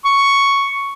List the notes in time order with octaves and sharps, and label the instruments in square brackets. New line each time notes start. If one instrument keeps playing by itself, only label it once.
[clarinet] C#6